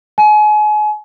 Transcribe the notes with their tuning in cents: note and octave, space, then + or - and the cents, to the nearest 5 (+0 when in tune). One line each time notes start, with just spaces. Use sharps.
G#5 +35